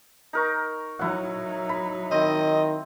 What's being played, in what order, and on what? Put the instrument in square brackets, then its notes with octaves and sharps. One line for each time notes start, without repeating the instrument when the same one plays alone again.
[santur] D#4 A#4 C#6
[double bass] F#3 D#4 [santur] E4 F#5
[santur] B5
[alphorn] D#3 [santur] C4 [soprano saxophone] D#5